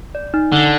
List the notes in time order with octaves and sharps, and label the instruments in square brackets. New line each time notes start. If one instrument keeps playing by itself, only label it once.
[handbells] D5
D#4
[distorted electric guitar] D3 [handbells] D#4